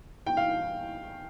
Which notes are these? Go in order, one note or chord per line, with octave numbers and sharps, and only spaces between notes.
G5
F5